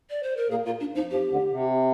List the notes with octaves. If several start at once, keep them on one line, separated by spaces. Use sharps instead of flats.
D5
C5
A#4
A#2 A#3 G#4
A#2 A#3 F4
D4
F2 F3 D#4
F2 F3 G4
D2 D3
C3